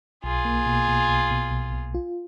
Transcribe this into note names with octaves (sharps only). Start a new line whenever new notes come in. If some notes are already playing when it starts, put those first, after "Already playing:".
B1 F4 G#4
A#3
B2
B2
B1
B2
B1
B1
F4